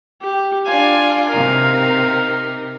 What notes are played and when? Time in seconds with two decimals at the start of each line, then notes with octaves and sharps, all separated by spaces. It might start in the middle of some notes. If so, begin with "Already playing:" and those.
0.22 G4
0.66 D4 F4 G#5
1.30 C3 D#4 A#4 F5